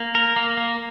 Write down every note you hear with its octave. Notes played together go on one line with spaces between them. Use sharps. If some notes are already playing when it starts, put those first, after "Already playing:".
Already playing: A#3
A#4
A#3
A#3